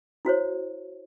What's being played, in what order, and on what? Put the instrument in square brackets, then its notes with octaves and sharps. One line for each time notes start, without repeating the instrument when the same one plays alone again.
[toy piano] E4 F#4 C5 C#5